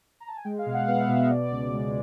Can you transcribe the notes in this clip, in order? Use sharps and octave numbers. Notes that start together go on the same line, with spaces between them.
A#5
A5
G#5
G#3 G5
F5
B2
F#5
B3 F5
E5
B2 E5
D#5
B2 D5
C#2
G#3